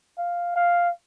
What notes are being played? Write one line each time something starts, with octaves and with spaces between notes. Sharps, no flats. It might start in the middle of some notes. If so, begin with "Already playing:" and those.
F5
F5